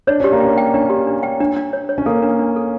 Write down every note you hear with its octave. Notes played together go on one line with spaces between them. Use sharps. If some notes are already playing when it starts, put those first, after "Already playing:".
D4 C#5
C#4 G4
A#3
C#4 G5
G5
C#4 D4
G4
D4
G5
D4
D4
C#5
C#5
C#4
A#3 A4
D4
D4
A4